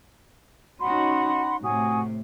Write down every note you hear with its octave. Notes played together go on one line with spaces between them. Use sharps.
C#4 D#4 F#4 F#5 B5 C6
A2 C3 F#4 G#5 D#6